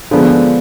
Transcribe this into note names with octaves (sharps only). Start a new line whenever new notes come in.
D3 F3 G#3 B3